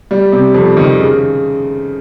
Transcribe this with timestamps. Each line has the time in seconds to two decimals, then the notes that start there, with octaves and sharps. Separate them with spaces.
0.11 G3
0.32 C3
0.54 F2
0.77 D#3
1.00 C#3